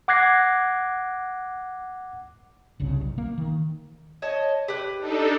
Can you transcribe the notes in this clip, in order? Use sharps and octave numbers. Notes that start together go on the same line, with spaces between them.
F#5 D6 F#6 G#6 A#6 C7
G1 C2 G2 C#3
B1
A#3
D#3
C#5 D#5 A5
G4 B4
D4 D#4 A4